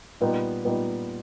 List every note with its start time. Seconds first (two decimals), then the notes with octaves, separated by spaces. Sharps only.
0.21 A#2 G3 B3 D#4
0.65 A#2 G3 B3 D#4